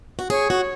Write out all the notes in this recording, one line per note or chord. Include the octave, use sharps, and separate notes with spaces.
F#4
G#4 C#5
F#4